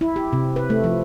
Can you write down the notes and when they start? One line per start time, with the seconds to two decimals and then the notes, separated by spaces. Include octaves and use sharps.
0.01 E4
0.16 G4
0.33 C3
0.56 B4
0.70 A3
0.84 F3